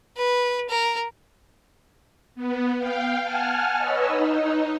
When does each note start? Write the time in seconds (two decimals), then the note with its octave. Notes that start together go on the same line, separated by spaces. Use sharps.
0.17 B4
0.69 A#4
2.35 B3
2.78 F5 G5
3.21 F#5 G#5 A5 F6
3.76 B4 C#5 D#5 E6
4.07 D#4